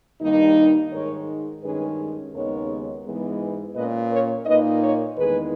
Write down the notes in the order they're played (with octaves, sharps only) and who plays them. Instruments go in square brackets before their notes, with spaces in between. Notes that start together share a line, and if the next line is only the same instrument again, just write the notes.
[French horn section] G2 D#3 G3 A#3 D#4
G#2 D#3 G#3 A#4 C#5
G2 D#3 G#3 C#4 G#4 B4
D#2 C#3 G#3 B3 D#4 A#4 C#5
G#2 E3 G#3 B3
A#2 A#3 C#4 B4 D#5
A#4 C#5
A#2 A#3 D#4 B4 D#5
A#4 C#5
E2 D#3 G#3 G#4 B4